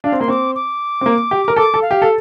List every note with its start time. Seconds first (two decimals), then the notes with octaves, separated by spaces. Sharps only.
0.04 D4 F5
0.12 C4
0.20 A#3 C6
0.28 C4 D6
0.55 D6
1.01 C4
1.06 A#3
1.31 G4
1.48 A#4
1.56 A4 D6
1.74 A4
1.82 F5
1.91 G4
2.02 A4